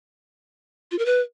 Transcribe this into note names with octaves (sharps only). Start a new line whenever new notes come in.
F4
A#4
B4